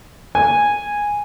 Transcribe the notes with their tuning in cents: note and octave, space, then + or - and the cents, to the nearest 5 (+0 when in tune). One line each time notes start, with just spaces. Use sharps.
G#5 -5